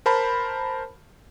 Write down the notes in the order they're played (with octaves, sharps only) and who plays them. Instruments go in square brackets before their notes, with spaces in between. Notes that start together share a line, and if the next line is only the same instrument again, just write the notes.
[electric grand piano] A#4 C5 A5 B5